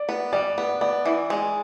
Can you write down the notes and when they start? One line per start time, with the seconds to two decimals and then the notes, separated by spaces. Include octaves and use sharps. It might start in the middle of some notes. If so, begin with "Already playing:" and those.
Already playing: D5
0.09 B3
0.33 G3 D5
0.58 B3
0.81 B3 D5
1.05 E3
1.30 G#3